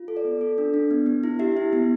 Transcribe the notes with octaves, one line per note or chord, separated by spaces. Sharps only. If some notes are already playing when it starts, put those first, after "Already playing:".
Already playing: F4
A4
D5
B3
A4
D4
D4
B3
B3
E4
G4 E5
E4
B3